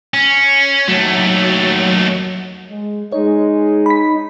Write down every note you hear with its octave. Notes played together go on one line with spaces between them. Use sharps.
C#4
D#2 F#3 A3
G#3
G#3 D#4 C#5
B5 B6